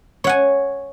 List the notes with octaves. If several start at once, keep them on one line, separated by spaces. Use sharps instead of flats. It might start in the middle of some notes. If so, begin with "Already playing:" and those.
C#5 F#5 G#5